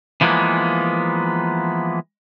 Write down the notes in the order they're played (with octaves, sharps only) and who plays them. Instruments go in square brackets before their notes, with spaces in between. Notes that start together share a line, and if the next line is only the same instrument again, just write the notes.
[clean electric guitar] E3 F3 G#3 A#3 B3